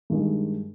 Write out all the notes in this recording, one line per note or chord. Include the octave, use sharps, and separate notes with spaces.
G2 D#3 G#3